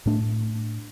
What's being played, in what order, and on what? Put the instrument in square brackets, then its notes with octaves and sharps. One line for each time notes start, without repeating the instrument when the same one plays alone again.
[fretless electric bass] A2 A3 D4